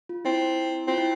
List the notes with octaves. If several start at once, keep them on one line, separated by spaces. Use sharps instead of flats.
F4
C4 E4
C4 F4
E4